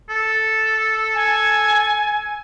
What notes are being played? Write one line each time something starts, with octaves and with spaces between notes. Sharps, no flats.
A4
G#5